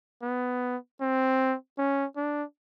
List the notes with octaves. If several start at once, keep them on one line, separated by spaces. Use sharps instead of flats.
B3
C4
C#4
D4